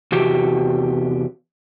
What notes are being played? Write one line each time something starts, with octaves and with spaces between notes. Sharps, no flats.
E2 C3 F#4 G4